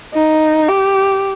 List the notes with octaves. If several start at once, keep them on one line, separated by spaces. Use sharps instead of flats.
D#4
G4